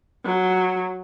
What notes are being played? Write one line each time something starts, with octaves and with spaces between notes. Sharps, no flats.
F#3